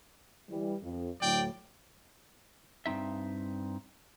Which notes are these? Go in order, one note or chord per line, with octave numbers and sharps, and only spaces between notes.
E3 G3
F2
D2 A2 F#3 D5 G5
G2 C4 D#4 E5